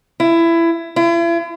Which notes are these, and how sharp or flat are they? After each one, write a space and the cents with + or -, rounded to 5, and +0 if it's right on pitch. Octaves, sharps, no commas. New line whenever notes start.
E4 +20
E4 +40